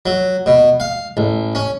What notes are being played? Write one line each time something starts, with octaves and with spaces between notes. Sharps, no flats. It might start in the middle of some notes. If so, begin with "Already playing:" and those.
F#3
B2
F5
A1
C#4